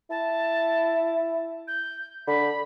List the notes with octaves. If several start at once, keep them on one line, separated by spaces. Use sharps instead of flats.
E4 A5
G6
D3 B5